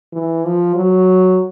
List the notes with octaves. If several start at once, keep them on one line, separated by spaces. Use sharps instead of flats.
E3
F3
F#3